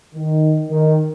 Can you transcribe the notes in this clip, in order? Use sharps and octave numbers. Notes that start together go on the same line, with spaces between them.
D#3
D#3